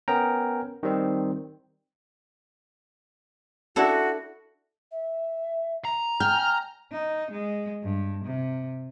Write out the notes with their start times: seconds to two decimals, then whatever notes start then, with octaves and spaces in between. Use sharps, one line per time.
0.08 B3 C#4 A#4 G5 A#5
0.83 D#3 G3 C4
3.76 D4 E4 F#4 A4
4.91 E5
5.85 A#5
6.20 G5 G#5 F6
6.91 D#4
7.31 G#3
7.83 G2
8.25 C3